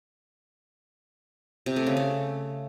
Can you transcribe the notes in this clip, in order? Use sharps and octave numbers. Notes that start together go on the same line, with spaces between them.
C3
A3
C#3
A3